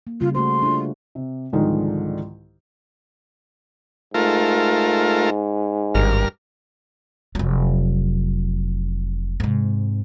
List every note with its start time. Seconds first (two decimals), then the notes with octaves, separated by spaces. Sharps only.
0.07 A#3
0.21 C#3 G3 F4
0.35 A3 F#4 C5 C6
0.62 D4 F4
1.15 C3
1.53 C2 G#2 D3 D#3 F3 G#3
4.14 G#2 A3 F4 A#4
5.95 G#1 G2 A#4 F6
7.35 F1 F#3
9.40 G#2 C3